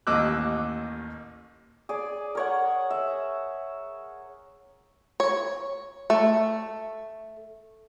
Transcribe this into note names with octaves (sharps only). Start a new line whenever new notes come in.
A1 D#2 D#5 D6 E6 F#6
G#4 D5
A#4 C#5 F#5
E5
C#5
A3